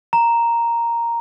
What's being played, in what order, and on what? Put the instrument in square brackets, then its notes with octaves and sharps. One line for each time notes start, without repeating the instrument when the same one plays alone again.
[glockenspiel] A#5